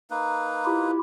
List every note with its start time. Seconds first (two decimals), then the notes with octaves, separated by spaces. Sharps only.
0.10 A#3 D#4 B4
0.65 E4 F4 G4